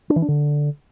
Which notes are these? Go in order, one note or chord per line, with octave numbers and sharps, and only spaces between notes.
D4
E3
D4
D3